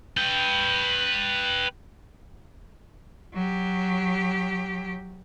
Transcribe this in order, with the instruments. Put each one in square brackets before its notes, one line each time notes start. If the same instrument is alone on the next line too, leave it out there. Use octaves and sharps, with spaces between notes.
[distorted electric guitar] B4 G5
[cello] F#3 G4